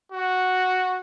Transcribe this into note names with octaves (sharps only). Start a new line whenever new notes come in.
F#4